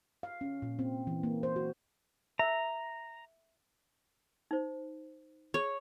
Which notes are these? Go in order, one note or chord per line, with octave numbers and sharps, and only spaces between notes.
F5
C#4
A#2
C4
E3
A#3
C5
F#4
E5 A#5
D#4 C5
G#4 C#5